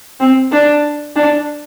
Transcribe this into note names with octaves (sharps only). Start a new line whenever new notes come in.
C4
D4
D4